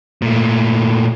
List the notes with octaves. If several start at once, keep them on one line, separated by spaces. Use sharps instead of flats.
A#2 A3